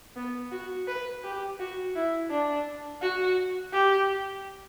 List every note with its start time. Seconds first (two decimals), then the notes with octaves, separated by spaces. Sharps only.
0.16 B3
0.52 F#4
0.88 B4
1.24 G4
1.60 F#4
1.96 E4
2.31 D4
3.02 F#4
3.73 G4